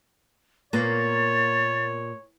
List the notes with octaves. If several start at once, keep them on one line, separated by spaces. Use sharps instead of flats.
A#2 A#3 B3 C#5 A6